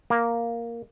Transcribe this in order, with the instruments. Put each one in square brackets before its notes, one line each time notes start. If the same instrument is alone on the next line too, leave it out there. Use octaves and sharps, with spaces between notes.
[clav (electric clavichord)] A#3